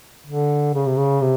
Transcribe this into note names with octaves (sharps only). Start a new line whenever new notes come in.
D3
C#3
C3
C#3
C3